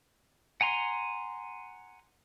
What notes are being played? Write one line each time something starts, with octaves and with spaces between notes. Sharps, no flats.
F#5 G#5 A#5 C6